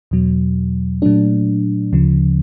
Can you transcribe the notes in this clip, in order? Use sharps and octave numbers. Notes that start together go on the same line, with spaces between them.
E2 B2 F#3
A#2 F#3 A3 D4
D2 C#3 F3